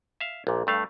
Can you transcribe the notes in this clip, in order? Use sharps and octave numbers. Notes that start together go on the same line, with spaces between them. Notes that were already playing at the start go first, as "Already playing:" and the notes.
E5 F5
A#1 A#2
G2 A3 F5